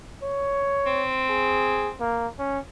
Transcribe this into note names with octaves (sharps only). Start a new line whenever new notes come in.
C#5
C4
G#4
A#3
C#4